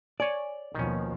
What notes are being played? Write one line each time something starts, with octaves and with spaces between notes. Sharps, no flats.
C#5 D5 G#5
D#2 B2 D#3 F3 C#4